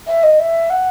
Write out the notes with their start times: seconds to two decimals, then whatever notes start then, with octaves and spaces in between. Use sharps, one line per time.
0.07 E5
0.23 D#5
0.40 E5
0.70 F#5